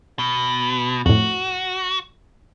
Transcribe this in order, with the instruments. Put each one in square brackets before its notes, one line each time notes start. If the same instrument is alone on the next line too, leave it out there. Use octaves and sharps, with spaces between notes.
[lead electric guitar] B2
[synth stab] F2 A2 [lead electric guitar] F#4